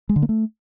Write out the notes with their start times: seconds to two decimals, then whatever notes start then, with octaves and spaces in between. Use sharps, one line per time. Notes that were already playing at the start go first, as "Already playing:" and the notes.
0.09 G#3
0.16 D3
0.22 A#3
0.29 A3